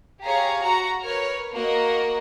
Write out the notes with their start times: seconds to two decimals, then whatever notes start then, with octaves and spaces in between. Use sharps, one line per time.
0.25 G4 G#4 C#5 F5 A#5
0.60 F#4 A#5
1.03 A#4 B4 C#5 F6
1.52 A#3 F#4 A#4 D#5